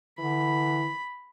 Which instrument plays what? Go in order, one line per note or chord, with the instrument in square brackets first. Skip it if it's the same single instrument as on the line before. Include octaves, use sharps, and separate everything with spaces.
[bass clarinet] D3 [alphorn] E3 [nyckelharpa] B5